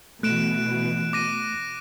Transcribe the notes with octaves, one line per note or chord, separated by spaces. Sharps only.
B2 E3 A3 F#6 D7 E7
D6 A#6 D#7